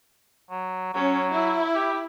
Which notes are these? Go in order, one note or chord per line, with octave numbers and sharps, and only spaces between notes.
F#3
F#3 C#4
E4
G4